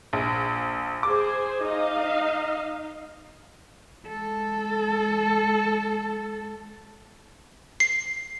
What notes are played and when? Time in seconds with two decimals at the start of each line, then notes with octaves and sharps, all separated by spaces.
0.13 A#1
1.03 G#4 C5 D6
1.65 D#4 D#5 F5
4.08 G#3 A4
7.80 C7